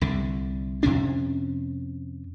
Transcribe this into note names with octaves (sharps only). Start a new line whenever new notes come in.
C2 D3
F2 C3 C#4 D4